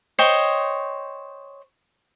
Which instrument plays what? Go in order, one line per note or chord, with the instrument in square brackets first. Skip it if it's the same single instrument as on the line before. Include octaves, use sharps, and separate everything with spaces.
[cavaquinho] C5 C#5 D#5 G5